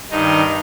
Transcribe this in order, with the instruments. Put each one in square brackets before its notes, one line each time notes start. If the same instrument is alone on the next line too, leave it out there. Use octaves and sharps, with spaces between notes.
[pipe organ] G2 D#3 D#4